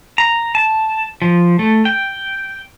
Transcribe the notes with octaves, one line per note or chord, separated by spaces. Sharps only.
A#5
A5
F3
A3
G5